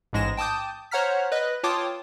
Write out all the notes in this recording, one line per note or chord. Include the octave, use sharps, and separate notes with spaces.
A1 G#2 G#3 A#6 E7
G5 A5 D6 D#6 G6
C5 C#5 F#5 A#5 F6 B6
B4 D#5 F#6
F4 C#5 G5 A5 D6 D#6